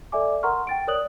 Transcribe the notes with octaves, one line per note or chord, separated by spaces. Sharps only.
A4 D5 E5 G#5 D6
A#4 F#5 A#5 C6 C#6 F6
G5 A6 D7
A#4 C#5 D5 D#6 F#6 F#7